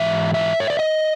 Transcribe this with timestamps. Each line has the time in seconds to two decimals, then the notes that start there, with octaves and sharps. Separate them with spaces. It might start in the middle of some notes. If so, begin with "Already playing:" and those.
Already playing: G#2 E3 E5
0.34 E5
0.60 C#5
0.70 D5
0.79 D#5